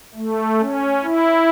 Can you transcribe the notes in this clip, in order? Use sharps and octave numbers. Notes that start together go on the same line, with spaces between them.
A3
C#4
E4